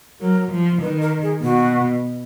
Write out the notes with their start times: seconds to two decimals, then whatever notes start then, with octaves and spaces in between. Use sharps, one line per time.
0.21 F#3 A#4
0.52 F3
0.82 D#3 B4
1.02 A#4
1.22 G#4
1.43 B2 F#4